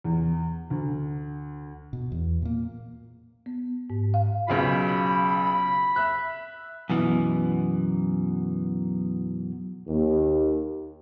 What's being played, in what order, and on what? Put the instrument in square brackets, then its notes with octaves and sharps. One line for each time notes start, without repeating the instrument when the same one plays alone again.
[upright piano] E2
D2
[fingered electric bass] B2
E2
A#2 A#3
[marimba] B3
G#2
F5
[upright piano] B1 C#3 F4 [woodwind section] B5
[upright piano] E5 F#6
[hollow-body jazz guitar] F#2 B2 E3
[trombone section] D#2